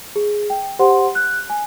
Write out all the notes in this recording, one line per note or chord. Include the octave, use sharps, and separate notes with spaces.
G#4
G5
G4 C5 F#5 C6
F#6
G#5